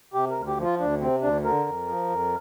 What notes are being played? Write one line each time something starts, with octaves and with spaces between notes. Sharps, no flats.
C3 G4
A#4
D2
G4
F3
F4
D2 D4
C3 C4
D2 D4
D3 A#4
F2
F3
F2